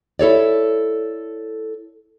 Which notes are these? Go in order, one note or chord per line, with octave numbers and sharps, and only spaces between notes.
E4 A4 C#5 D5